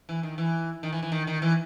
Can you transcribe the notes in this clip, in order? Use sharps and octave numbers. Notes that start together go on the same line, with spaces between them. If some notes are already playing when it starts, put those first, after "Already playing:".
E3
D#3
E3
D#3
E3
E3
D#3
D#3
E3